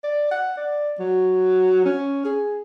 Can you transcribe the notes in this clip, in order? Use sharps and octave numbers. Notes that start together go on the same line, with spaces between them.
D5
F#5
D5
F#3
C#4
G#4